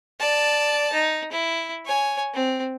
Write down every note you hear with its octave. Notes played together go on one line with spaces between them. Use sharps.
D5 A5
D#4
E4
C#5 G#5
C4